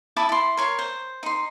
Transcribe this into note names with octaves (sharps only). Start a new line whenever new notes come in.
E4 A5 D6 D#6
E4 C6
A#4 C#5 C6
C5
D#4 C6